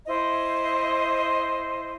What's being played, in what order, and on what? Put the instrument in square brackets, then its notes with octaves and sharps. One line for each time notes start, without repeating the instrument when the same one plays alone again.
[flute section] E4 C5 D#5